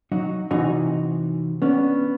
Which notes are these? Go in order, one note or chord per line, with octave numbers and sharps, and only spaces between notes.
F#3 D#4 F#4
C3 E3 D#4 F#4 D#5 G#5
B3 C#4 D4